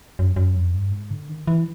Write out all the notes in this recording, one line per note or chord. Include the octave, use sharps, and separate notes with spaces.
F#2
F#2
F2
G2
G#2
D3
D#3
E3